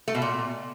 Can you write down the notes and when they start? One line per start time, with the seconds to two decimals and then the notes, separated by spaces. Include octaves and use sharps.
0.08 A3
0.15 B2
0.22 A#2